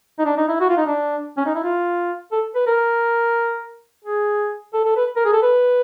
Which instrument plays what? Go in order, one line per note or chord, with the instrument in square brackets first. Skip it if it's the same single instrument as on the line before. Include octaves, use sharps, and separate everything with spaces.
[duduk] D#4
D4
D#4
E4
F#4
F4
D#4
D4
C#4
D#4
E4
F4
A4
B4
A#4
G#4
A4
A4
B4
A#4
G#4
A4
B4